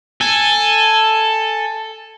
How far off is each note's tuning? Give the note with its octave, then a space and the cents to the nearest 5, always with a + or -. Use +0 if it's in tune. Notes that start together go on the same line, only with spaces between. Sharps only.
A4 +5 G#5 +0